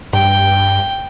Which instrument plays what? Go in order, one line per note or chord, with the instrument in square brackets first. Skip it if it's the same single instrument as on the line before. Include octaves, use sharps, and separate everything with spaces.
[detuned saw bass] G2 [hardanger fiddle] G5